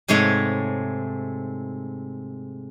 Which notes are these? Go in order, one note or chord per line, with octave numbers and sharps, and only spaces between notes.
G#2 C3 G#3 A3 C#5 F#5